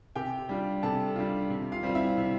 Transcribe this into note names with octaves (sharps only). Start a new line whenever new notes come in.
C3 G4 G5
G3 D4 F4
C3 A4 A5
G3 D4 F4
C3
F4 F5
G3 C4 F4
E4 E5
C3